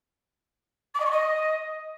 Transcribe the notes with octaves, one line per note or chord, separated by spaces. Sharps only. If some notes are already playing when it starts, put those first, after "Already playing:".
D6
D#5
C#6
D#5